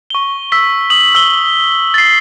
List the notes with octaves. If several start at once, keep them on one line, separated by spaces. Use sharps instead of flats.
C#6 G7
E6 B6 G7
D#6 F#7
E6 F#7 G7
A6 C7